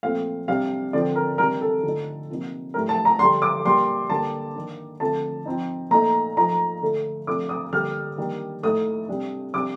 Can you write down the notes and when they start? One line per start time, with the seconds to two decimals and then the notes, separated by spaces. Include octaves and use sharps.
0.03 A#2 F3 A3 C4 F5
0.48 C3 G3 D4 F5
0.93 D3 F3 C4 D5
1.16 A#4
1.38 C3 D#3 G3 D4 A#4
1.61 A4
1.83 D3 F3 A3 D#4
2.30 C3 F3 A#3 D#4
2.74 A2 G3 D4 A#4
2.89 A5
3.05 A#5
3.19 D3 G3 D4 C6
3.42 D6
3.66 A#2 G3 A#3 C6
4.10 D3 G3 A#3 D4 A5
4.55 D#3 A#3 D4
5.00 D3 F3 A3 C4 A5
5.45 F3 C4 D#4
5.91 A#2 A3 D#4 A#5
6.37 F3 A3 D#4 A#5
6.81 D3 A3 D4
7.27 C3 F3 A3 D4 D6
7.49 D#6
7.73 D3 G3 A#3 D4 F6
8.18 D#3 G3 A#3 D4
8.63 A2 A3 D#4 D#6
9.08 C3 G3 D4
9.54 C3 G3 D4 D6